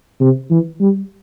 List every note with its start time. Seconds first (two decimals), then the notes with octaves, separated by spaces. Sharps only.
0.21 C3
0.50 E3
0.80 G3